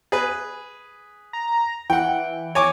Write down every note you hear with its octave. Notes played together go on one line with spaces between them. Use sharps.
G#4 B4
A#5
E3 F#5 G5
C#5 G#5 D6